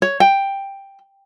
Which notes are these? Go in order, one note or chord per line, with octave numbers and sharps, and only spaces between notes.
C#5
G5